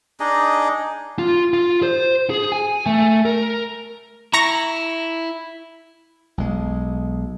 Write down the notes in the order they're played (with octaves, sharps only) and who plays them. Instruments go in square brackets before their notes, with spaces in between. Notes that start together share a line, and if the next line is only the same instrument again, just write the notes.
[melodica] D4 D#4 G#4 D#5
[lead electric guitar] F4
F4
C5
G#4
G#5
A3
A#4
[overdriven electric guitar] E4 [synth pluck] A#5 C#6 A#6
[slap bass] B1 G#3